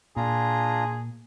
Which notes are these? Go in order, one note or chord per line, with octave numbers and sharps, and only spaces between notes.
A#2 D4 F4 G#4 A#5